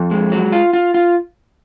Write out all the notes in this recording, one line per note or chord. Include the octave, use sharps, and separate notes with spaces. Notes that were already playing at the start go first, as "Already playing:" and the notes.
Already playing: F2
G#3
F#3
F4
F4
F4